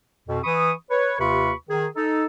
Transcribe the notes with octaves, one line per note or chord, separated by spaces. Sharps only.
F2 B2
E3 B5 C#6 D#6
B4 C#5
D#2 C3 F4 B4 B5 C#6
D#3 G#4
D#4 A4